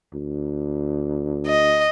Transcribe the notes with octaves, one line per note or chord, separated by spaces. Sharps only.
D2
D#5